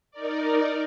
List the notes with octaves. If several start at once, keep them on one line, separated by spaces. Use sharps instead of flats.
D#4 A#4 D5